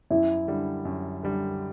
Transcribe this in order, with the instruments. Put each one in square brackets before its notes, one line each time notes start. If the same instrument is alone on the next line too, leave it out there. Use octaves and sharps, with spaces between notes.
[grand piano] F#2 [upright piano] E4
[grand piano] D3 G3
F#2
D3 G3